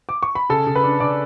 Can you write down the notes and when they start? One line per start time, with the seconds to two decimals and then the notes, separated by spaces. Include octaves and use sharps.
0.09 D6
0.23 C#6
0.35 B5
0.49 C#3 A4 A5
0.67 C#3
0.75 B4 B5
0.83 D4
1.00 C#3 D5 D6